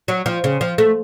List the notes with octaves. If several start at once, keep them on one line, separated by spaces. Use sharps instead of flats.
F#3
F3
C#3
F3
A3